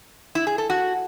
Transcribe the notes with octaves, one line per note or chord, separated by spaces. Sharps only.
E4
G#4
A4
F#4